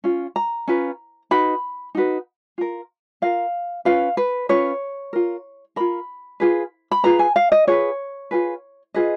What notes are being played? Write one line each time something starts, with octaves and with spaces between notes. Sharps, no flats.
C#4 F4
A#5
C#4 F4 B4
D#4 F#4 B4 B5
D#4 F#4 B4
F4 A#4
F4 A#4 F5
C#4 F4 B4 F5
B4
C#4 F4 B4 C#5
F4 A#4
F4 A#4 B5
F4 G#4 B4
B5
F4 G#4 B4 A#5
G#5
F5
D#5
F4 G#4 B4 C#5
F4 G#4 B4
F4 G#4 B4 D#5